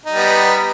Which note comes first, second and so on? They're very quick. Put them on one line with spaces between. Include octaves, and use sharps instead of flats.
D#4 G3 B3